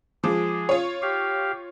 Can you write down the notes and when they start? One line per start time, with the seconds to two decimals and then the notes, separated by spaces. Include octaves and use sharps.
0.24 F3 G#3 G#4 D6
0.69 F4 C#5
1.02 G4 F5